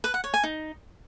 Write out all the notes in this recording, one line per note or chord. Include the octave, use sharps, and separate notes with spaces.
B4
F#5
C#5
G#5
D#4